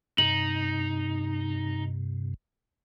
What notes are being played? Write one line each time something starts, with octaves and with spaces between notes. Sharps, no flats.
G2 C3 D#4 F#7